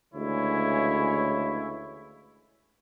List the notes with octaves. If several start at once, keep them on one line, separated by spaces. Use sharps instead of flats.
D2 C#3 E3 G#3 E4 C#5